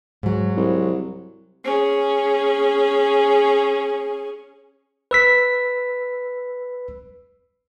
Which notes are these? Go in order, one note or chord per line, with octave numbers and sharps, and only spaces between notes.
G#2 F#3
C2
C#4 G#4
B4 E6 B6